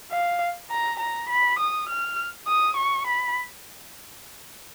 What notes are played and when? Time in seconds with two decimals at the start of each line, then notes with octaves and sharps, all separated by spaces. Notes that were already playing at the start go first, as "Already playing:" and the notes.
0.11 F5
0.71 A#5
1.00 A#5
1.30 B5
1.59 D#6
1.89 F6
2.48 D#6
2.77 C#6
3.07 B5